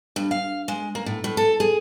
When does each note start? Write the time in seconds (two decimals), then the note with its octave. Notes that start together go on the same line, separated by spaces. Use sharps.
0.16 G2
0.31 F5
0.68 G#3
0.95 A#3
1.06 A2
1.24 A2
1.37 A4
1.60 G#4